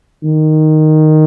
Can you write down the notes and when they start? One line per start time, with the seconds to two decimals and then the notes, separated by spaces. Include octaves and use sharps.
0.23 D#3